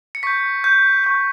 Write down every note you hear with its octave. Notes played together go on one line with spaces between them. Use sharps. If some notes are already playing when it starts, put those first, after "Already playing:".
C#7
C#6 G6 B6
G6
C#6 G6